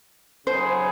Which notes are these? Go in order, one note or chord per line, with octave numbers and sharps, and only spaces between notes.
C#3 F#3 B3 D#4 G#4 C5